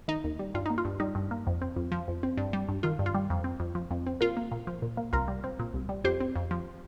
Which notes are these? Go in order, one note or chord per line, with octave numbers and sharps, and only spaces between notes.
D#3 D#4
D#2
G3
G2 F4
A#3 D#4
F4
G2
G3 D#4
G2
A#3
F2
C4
F2
F3
F2
C4
G2
G3
G2
D#3 F4
G2
F4
G3
F2
C4
F2
F3
F2
C4
A#2 F4 A#4
A#3
A#2
F3
A#2
A#3
C2 F4 A#4
G3
C4
A#2
C2
G3
F2 G4 C5
C4
F2
F3